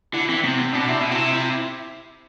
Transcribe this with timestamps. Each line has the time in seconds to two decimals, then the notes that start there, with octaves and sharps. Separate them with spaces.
0.14 D3 E4
0.29 E3 C4
0.44 C3 B3
0.58 C4
0.73 B2 D4
0.88 C3 E4
1.00 B2
1.11 C3
1.33 E4